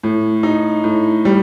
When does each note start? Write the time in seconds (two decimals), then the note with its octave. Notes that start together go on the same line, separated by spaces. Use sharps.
0.03 A2
0.43 D#4
0.84 A2
1.25 G3